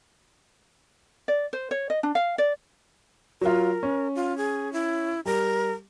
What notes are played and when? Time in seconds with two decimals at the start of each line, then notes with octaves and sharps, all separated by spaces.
1.28 D5
1.53 C5
1.71 C#5
1.90 D#5
2.03 D4
2.15 F5
2.38 D5
3.41 F#3 F4 A#4
3.83 C#4
4.15 F4
4.37 G#4
4.73 E4
5.25 G3 A#4